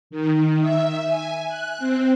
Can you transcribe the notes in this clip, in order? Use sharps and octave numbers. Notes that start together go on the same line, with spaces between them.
D#3
E5
G#5
F#6
C4